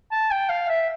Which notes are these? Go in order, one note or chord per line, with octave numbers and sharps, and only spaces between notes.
A5
G5
F5
E5